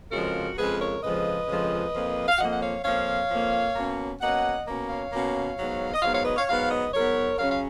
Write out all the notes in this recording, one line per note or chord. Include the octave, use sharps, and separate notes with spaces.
F2 C#3 F3 G#3 F#4 A#4
F2 C#3 F3 G#3 G#4 B4
A#4 C#5
F2 C#3 F3 G#3 B4 D#5
F2 C#3 F3 G#3
F2 F3 A#3
F5
F2 F3 A#3 D#5 F#5
F#5
C#5 F5
F2 F3 A#3 C#5 F5
F2 F3 A#3
B2 A#3 C#4
B2 A#3 C#4 D#5 F#5
B2 A#3 C#4
C#5 F5
B2 A#3 C#4
G#2 F#3 B3
D#5
G#2 F#3 B3 C#5 F5
C#5 F5
B4 D#5
C#5 F5
G#2 F#3 B3 C#5 F5
B4 D#5
G#2 F#3 B3 A#4 C#5
C#3 F#3 C#4 C#5 F5
F5